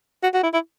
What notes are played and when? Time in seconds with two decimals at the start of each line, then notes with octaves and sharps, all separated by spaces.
0.23 F#4
0.34 F#4
0.43 E4
0.53 E4